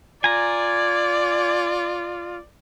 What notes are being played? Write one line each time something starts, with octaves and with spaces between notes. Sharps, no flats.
F4 D5 G#5 A#5